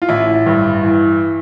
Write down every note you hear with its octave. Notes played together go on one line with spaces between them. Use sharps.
F4
A1 E4
G2
E3